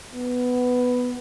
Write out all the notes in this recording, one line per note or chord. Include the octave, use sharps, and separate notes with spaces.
B3